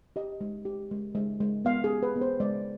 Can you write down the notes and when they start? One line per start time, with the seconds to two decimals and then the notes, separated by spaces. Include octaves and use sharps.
0.16 G4 D#5
0.41 G#3
0.65 G4
0.91 G#3
1.15 G#3
1.41 G#3
1.65 B3 F5
1.84 G#4
1.90 G4
2.03 B4
2.16 B3
2.21 C5
2.40 G#3 D5